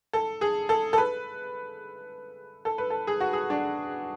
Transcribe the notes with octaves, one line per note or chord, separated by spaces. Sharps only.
A4
G#4
A4
A4
B4
A4
B4
A4
G#4
F#4
G#4
D4